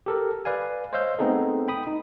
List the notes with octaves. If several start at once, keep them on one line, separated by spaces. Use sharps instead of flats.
G4 A4 A#4
B4 D5 F5 G#5
C5 C#5 D#5 F5 E6 G6
A3 B3 C4 D#4 G#4 A4
G5 B5 D#6
D#4